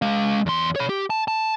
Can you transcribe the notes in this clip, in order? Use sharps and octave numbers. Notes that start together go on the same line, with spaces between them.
G#3 F5
E2 C6
C#5 B5
G4
A5
A5